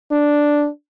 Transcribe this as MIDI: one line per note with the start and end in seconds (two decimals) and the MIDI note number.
0.12 0.68 62